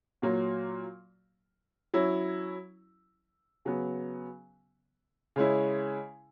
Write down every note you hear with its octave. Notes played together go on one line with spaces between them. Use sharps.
A#2 F#3 A#3
F#3 C#4 E4
C#3 F#3 B3
C#3 G#3 C#4 E4